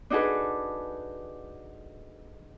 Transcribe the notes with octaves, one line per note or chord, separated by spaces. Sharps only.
D4 D#4 F#4 G#4 A4 B4